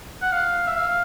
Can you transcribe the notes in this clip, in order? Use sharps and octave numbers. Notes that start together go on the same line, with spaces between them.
F#5
F5
E5
F5